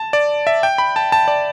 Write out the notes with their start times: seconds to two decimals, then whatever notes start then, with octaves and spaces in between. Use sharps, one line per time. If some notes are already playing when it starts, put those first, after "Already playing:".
Already playing: A5
0.13 D5
0.47 E5
0.63 G5
0.78 B5
0.96 A5
1.12 A5
1.28 D5